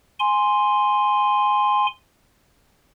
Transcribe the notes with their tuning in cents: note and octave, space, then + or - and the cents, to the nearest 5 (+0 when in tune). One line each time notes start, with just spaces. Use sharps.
G#5 +0 C6 +0